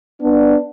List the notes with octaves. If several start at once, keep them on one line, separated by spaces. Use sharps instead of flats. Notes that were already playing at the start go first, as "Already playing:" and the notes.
B3 D4